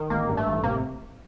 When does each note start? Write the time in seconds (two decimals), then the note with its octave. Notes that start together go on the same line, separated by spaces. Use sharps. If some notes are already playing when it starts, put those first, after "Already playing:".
Already playing: D#3
0.10 A1 A#3
0.29 G2
0.37 A3
0.47 A1
0.63 C3 A#3